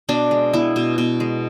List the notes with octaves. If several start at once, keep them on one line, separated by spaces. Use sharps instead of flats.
B2 D4
G#3
B3 E4
B2
B2
G#3